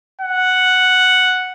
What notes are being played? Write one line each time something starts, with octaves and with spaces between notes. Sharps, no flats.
F#5